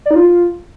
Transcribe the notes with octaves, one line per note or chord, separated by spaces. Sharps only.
D5
D#4
F4